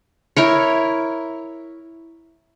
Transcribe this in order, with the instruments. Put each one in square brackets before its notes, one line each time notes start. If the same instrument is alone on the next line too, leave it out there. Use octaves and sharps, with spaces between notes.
[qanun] E4 A#4 C#5